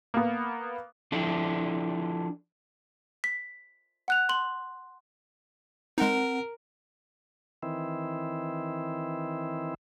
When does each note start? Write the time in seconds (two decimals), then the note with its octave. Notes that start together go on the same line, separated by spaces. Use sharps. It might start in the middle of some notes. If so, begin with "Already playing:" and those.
0.14 A#3 B3
1.12 F3 D4 E4 A4
3.24 B6
4.08 F#5 F#6 F7
4.29 C6 F#7
5.98 G#3 C4 D#4 A#4 F#5
7.63 D#3 E3 C4 E4